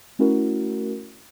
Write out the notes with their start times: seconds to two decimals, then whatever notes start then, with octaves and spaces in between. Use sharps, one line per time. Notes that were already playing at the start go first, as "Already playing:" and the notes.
0.19 A3 C#4 E4 F#4 A#4